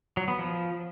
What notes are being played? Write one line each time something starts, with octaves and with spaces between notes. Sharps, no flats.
F#3
B3
F3